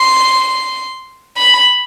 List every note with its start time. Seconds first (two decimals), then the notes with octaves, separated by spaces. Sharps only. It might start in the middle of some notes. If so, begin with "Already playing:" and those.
Already playing: C6
1.37 B5